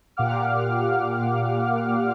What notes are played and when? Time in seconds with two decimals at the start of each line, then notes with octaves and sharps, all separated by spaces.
0.17 A#2 G4 F5 F#5 D6 F6